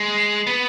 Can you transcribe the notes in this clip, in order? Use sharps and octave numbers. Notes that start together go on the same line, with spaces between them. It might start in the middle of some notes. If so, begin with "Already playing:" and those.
Already playing: G#3
B3